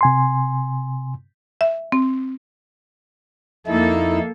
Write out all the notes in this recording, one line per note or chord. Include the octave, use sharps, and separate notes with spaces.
C3 G#5 C6
E5
C4
F2 A#3 D#4 E4 A4